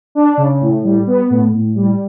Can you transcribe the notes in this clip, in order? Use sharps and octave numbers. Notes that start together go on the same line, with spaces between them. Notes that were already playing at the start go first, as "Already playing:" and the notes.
D4
C#3
A2
G3
B3
A2
A2
G3